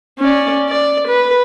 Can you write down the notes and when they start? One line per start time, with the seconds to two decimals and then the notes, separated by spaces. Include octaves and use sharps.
0.19 C#4 D5
0.69 D5
1.08 B4